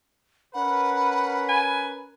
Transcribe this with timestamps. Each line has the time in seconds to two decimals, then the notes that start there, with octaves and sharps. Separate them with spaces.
0.54 C#4 A#4 B4 F#5 B5
1.49 G#5